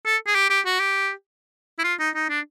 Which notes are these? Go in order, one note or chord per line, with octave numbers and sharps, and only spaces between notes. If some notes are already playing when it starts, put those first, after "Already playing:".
A4
G#4
G4
G4
F#4
G4
E4
F4
D#4
D#4
D4